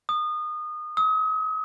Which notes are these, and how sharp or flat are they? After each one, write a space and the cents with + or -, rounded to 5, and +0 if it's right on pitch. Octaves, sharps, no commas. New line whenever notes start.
D#6 -25
D#6 +40